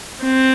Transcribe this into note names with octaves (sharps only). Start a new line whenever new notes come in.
C4